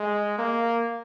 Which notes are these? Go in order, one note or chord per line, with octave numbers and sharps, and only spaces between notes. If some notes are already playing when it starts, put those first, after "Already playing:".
Already playing: G#3
A#3